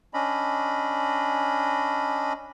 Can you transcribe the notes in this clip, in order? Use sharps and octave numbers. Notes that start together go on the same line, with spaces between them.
C#4 D4 D#5 B5